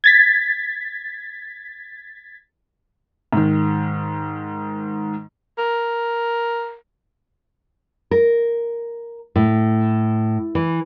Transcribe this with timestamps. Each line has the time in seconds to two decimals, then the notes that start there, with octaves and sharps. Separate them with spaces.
0.04 G#6 A6 B6
3.33 G#2 D#3
5.58 A#4
8.11 A#4
9.36 A2
10.55 E3